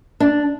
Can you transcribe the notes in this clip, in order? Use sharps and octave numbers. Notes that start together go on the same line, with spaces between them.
D4